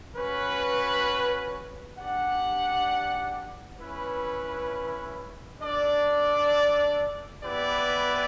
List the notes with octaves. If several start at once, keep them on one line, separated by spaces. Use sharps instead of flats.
C#4 F#4 B4
D4 G4 D5 F#5
C#4 E4 B4
D4 A4 D5
B3 E4 G4 B4 D5